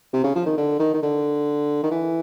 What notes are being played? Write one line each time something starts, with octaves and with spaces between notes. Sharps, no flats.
C3
C#3
F3
D#3
D3
D#3
D#3
D3
D#3
E3